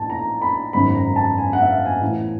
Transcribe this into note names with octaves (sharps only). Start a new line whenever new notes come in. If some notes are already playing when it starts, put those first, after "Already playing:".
Already playing: A#1 A2 E3 G#5 A5
A#5
B5
G#1 F#2 C#3 B5
A#5
A5
G#5
F#5
E5
F5
G#5
A1 A2 E3